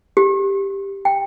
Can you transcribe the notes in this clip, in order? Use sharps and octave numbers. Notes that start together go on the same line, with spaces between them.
G4
G5